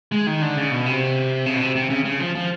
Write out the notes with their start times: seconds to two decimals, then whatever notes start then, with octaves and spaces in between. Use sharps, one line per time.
0.12 G#3
0.27 D#3
0.42 D3
0.57 C#3
0.71 B2
0.86 C3
1.46 C#3
1.54 B2
1.61 C3
1.76 C3
1.90 C#3
2.05 C#3
2.19 F3
2.35 F3